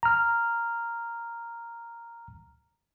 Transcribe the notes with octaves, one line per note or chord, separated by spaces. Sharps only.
A#5 F6